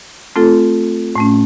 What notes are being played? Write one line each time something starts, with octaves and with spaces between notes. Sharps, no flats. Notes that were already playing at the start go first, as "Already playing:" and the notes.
A3 C4 F4 A4
A2 A3 C#4